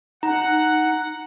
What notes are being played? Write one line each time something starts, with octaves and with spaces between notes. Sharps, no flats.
D#4 F#5 A#5